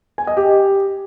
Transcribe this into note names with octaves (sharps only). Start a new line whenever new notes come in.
G#5
D#5
G4